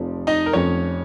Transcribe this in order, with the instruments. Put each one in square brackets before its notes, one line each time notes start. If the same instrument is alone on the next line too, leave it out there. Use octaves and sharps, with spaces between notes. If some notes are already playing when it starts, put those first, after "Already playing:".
Already playing: [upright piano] F1 F2 F3
[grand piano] D#4 D#5
A#4
[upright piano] F1 F2 F3 [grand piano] C#4 C#5